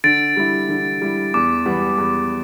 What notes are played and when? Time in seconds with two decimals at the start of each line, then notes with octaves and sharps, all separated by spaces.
0.04 D3 A6 D7
0.36 G3 E4
0.69 D3
1.01 G3 E4
1.34 E2 D6
1.66 E3 G3 B3
1.98 E2